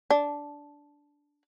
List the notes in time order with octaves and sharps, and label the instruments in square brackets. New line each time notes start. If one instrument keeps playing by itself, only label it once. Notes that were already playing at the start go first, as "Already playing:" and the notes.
[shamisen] D4